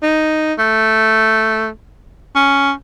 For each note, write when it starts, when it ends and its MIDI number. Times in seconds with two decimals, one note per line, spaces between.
0.03 0.54 63
0.58 1.68 57
2.35 2.72 61